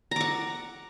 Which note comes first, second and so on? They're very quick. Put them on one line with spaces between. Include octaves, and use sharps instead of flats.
A#5 D6 F#5